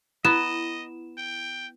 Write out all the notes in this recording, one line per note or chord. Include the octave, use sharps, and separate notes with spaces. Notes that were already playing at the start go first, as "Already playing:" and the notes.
B3 E4 D#5 E7
G5